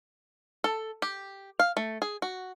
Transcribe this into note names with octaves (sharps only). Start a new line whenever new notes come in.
A4
G4
F5
A3
G#4
F#4